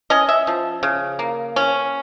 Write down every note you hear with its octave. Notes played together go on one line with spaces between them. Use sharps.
C#4 D#5
E5
F3
C#3
A#3
C#4